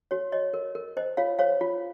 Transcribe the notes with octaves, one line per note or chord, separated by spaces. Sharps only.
F#4 C#5
C#5 D#5
A#4
A#4
C5 D#5
F4 C#5 F5
C5 C#5 F5
F4